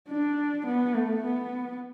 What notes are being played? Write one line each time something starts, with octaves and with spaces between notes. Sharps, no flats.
D4
B3
A3
B3